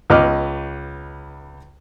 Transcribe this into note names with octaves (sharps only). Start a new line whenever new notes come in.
C#2 B3 B4 D#5 D6 F6